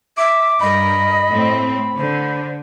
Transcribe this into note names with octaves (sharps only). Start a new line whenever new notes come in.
E5 D6
G2 A#4 D#5 B5
A2 C4
D3 C5